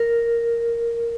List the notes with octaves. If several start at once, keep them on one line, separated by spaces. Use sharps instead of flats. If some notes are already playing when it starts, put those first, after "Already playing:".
Already playing: A#4